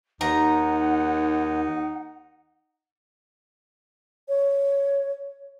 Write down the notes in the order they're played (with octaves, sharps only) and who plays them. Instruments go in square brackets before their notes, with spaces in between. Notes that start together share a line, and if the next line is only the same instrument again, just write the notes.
[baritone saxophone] D#2 [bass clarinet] D#4 [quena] F#5 [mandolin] A#5
[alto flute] C#5